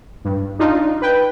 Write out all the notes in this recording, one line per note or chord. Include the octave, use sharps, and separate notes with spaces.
G2
D4 D#4 F4
B4 G5